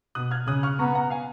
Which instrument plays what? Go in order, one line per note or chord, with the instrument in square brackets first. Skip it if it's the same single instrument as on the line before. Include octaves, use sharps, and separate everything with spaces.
[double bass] B2 [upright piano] D#6 F#6
[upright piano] F6 G#6
[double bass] C#3 [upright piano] D#6 F#6
[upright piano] C#6 F6
[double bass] B3 [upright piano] A#5 C#6
[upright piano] F#5 A#5
F5 G#5